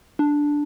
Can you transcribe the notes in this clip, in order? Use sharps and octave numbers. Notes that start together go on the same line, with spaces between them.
D4